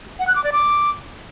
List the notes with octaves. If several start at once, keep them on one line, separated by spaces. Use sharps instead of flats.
F#5
F#6
D6
D5
D6